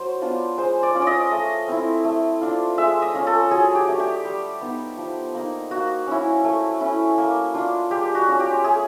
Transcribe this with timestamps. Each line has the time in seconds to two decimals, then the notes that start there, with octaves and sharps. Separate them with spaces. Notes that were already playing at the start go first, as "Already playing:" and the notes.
Already playing: F#3 C5
0.22 B3 D4 F4
0.58 G#3 C5
0.83 D5
0.95 C#4 F4
1.02 D5 D#5
1.31 A3
1.68 C4 E4
2.05 A3
2.41 D4 F4
2.78 G#3 E5
3.02 D#5
3.14 C#4 F4
3.27 A4
3.51 F#3 G#4
3.75 G4
3.88 A3 D4
4.00 G4
4.25 G3
4.61 B3 D#4
4.98 F3
5.34 A#3 D#4
5.71 A#3 F#4
6.07 C#4 E4
6.44 A3
6.81 C#4 E4
7.18 A#3
7.54 D4 F4
7.91 G#3 G4
8.15 F#4
8.28 C#4 F4
8.40 G4
8.64 A3 G#4